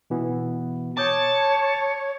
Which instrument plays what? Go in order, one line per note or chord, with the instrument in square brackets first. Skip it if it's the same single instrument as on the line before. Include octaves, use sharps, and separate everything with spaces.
[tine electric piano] B2 E3 B3
[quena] C#5 [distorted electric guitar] A5 [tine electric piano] D6 D#6 G6